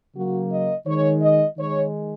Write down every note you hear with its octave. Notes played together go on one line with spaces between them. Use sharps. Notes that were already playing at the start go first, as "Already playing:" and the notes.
C#3 F#3 A#3 F#4
D#5
D#3 G#3 C#5
D#5
D#3 G#3 C#5